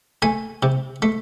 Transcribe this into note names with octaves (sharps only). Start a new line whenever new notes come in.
A3 G#5
C3
A3